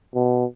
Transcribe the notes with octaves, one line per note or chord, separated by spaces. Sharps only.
B2